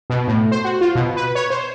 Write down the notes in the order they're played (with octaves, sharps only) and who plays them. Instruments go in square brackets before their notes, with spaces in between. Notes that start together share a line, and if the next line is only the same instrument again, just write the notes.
[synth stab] B2
A2
C5
F#4
F4
B2
B4
C#5
C5